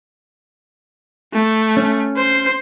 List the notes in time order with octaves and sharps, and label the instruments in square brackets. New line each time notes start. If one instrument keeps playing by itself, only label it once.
[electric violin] A3
[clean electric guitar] C#4
[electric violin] C5